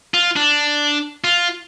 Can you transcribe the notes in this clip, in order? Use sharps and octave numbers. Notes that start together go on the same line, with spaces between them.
F4
D4
F4